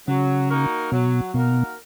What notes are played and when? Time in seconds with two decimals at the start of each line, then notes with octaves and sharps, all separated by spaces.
0.08 C#3 F#3
0.50 A#3 D#4 F#4 A#4
0.92 B2 F#3
1.34 B2 A#3 D#4 F#4 A#4